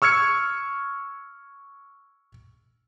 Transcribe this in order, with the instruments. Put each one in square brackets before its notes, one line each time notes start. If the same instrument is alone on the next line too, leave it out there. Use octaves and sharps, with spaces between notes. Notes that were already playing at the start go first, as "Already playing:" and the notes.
[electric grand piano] C#6 E6 F6 G#6 C#7